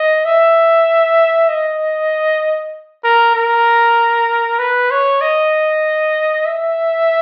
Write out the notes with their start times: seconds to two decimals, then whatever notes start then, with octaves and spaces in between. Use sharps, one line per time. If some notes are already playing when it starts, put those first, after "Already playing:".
Already playing: D#5
0.25 E5
1.49 D#5
3.04 A#4
3.35 A#4
4.59 B4
4.91 C#5
5.21 D#5
6.46 E5